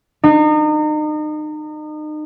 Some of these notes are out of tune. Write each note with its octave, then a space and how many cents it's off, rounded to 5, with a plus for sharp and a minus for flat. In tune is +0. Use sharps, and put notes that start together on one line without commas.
D#4 -35